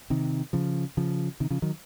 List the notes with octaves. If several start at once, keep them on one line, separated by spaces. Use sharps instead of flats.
C3 D#3
C#3 F3
C#3 F3
C3 D#3
C#3 F3
D#3 F#3